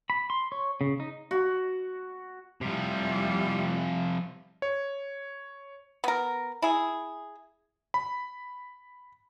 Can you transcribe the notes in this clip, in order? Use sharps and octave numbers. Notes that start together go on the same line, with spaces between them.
B5
C6
C#5
C#3
D#4
F#4
C3 F3 G3 E4
C#5
B3 A#4
E4 G#4
B5